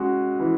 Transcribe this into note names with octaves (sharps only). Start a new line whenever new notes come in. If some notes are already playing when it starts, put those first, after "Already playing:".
Already playing: G#3 C#4 F#4
E3